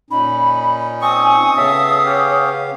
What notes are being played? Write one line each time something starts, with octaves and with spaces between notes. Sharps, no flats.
A#2 C#4 D#4 B5
C4 G#5 C#6 D#6
C#3 B3 A4 C#5 E5 F5
C#4 G4